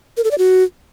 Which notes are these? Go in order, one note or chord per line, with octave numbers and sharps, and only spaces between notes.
A#4
A4
D5
F#4